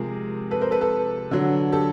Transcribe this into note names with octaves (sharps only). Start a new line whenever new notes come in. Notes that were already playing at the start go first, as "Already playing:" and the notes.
Already playing: C3 F3 G#3 G#4 A#4
A4 B4
A#4 C5
A4 B4
A4 B4
D3 F#3
G4 A4